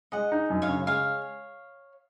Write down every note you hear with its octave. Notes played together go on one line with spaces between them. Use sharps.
G#3 D#5 F#5
D#4
F#2
C#5 F5
C#3
G#3 C#5 F5